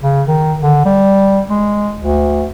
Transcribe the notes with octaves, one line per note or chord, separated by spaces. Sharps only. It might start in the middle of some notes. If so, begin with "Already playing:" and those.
C#3
D#3
D3
G3
G#3
D2